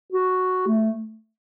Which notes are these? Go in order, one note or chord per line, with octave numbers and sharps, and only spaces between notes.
F#4
A3